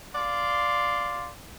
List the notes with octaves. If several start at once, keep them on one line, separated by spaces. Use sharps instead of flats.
D5 F5 C6